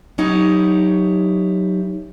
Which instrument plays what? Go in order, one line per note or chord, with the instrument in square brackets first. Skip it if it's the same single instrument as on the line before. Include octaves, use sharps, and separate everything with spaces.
[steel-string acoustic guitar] F#3 C#4 D#4 E4 G4